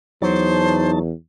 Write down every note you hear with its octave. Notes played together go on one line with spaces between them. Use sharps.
E2 F#3 D#4 C5 A5